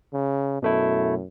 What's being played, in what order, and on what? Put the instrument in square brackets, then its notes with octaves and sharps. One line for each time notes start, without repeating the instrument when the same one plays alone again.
[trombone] C#3
[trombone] F#2 [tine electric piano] B2 A3 E4